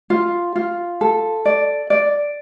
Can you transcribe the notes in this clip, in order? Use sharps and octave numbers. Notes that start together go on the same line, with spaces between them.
F4
F4
A4
D5
D5